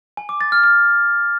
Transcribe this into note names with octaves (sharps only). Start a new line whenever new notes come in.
G#5
D6
A6
F6
F6